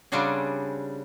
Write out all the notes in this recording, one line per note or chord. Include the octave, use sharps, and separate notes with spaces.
C#3 G3 C4 D4 F#4 G#4